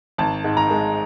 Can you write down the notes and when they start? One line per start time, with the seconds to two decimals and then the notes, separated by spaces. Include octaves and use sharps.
0.18 G#1 A5
0.44 G#2
0.57 A#5
0.70 G#3